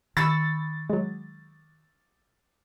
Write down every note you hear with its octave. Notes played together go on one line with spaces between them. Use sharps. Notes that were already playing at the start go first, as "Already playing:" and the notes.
D#3 B5 C#6 E6 A6
F#3 G#3